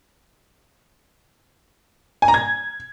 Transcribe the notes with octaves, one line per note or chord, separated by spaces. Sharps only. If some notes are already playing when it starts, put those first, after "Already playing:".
G#5
A#5
G#6